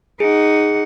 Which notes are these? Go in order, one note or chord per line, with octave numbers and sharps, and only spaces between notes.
D#4 G#4 F#5